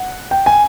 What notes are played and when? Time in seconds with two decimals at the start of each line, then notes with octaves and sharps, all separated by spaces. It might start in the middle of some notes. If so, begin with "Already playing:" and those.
Already playing: F#5
0.31 G5
0.46 G#5